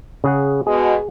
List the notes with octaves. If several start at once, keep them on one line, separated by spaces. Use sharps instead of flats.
C#3 G#4 F#5
B2 G#3 G#4